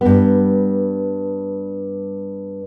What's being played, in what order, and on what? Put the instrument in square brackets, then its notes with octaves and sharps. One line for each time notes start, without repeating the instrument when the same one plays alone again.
[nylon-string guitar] G2 B3